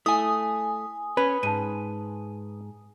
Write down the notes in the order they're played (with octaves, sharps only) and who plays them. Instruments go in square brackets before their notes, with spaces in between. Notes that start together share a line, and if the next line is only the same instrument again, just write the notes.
[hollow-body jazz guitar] A3 [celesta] E4 [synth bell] G#5 D#6
[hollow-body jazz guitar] C#4 [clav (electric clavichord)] B4
[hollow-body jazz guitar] G#2 [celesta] A5 D#7